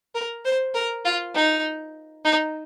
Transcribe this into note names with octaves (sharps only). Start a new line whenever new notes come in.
A#4
C5
A#4
F4
D#4
D#4